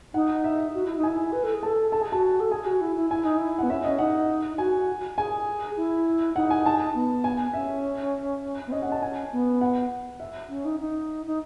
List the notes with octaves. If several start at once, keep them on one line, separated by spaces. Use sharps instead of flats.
D#4 F#5
E5
F#4
E4
D#4
E4 G#5
B4
A4
G#4
A4 A5
A4 A5
G#4 G#5
F#4 A5
A4
G#4 G#5
F#4
E4
E4
E4 G#5
D#4
E4
B3 F#5
C#4 E5
C#4 D#5
D#4 F#5
F#4 G#5
G#4 G#5
E4
D#4 F#5
G#5
A5
B3
G#5
C#4 E5
B3
C#4 D#5
F#5
A5
G#5
B3
F#5
E5
C#4
D#4
D#4
D#4